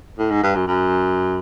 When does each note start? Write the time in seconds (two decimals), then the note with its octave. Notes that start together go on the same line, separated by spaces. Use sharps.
0.19 A2
0.31 G#2
0.43 G2
0.56 F#2
0.67 F#2